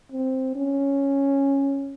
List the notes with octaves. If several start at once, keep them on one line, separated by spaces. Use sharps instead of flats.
C4
C#4